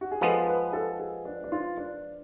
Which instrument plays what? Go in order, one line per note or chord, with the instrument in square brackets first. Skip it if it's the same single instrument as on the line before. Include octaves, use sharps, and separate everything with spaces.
[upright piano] F#4
G#4
[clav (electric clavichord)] F3 G#3 B3 [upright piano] A4
[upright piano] B4
A4
G#4
D4
D4
F4
D4